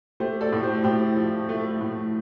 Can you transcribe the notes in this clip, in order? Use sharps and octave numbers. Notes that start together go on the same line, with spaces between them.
A3 G4 C5
A4 D5
A2
G4 C5
A2 G4 C5
F3
A3
A2